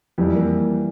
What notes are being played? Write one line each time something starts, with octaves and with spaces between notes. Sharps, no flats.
F2 E3 G3
A#3